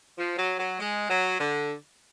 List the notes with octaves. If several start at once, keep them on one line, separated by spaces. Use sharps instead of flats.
F3
F#3
F#3
G#3
F#3
D3